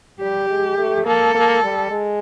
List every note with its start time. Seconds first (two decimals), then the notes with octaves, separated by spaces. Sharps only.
0.21 G3 G4
0.49 G#3
0.78 A3
1.06 A#3 A4
1.35 A#3
1.63 G3
1.91 G#3